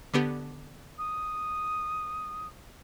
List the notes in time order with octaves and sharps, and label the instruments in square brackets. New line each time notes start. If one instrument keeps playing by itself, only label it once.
[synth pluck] D3 B3 G4
[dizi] D#6